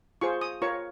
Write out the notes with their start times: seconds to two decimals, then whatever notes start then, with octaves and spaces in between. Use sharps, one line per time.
0.21 F4 G#4 C5 C#6
0.41 D#6
0.62 F4 A#4 C#5 C#6